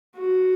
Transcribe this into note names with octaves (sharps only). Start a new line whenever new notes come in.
F#4